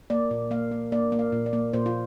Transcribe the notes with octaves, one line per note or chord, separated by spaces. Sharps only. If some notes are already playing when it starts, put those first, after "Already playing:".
A#3 D5
A#2
A#3 F5
A#3
A#3 D5
A#3
F5
A#2
D5
A#3
A#2 C5
F4